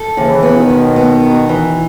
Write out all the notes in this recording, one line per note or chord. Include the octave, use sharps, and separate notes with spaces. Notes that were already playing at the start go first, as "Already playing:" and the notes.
Already playing: A4
D#2 C#3 E3
B3
B2 D#3
D#2
B3
F#4
E3